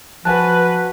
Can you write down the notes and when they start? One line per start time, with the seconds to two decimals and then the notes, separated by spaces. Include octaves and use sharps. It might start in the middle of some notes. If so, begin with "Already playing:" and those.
0.25 F3 F#4 B4 G#5 A5 F#6